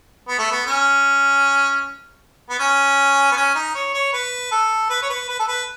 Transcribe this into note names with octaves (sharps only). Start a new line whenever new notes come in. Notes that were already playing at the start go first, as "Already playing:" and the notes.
B3
A3
B3
C#4
B3
C#4
B3
C#4
D#4
C#5
C#5
B4
A4
B4
C#5
B4
B4
A4
B4